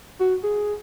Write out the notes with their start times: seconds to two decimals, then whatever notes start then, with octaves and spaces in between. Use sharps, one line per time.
0.20 F#4
0.44 G#4